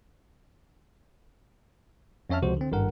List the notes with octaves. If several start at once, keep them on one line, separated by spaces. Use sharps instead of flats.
F2 C#4 C#5 E5 A5 F6
C#2 C3 F3 F#4 C5
D3 C4
G#1 G2 A#4 F#5